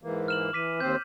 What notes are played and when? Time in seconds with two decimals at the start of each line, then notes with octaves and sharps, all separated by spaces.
0.03 G#2 E3 A#3
0.28 F6 E7 F#7
0.53 E3 D6 B6 D#7
0.80 D#2 C4 C5 G6